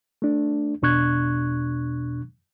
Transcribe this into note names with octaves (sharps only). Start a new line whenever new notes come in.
A3 D4
E2 B2 D4 C#6 F#6 G#6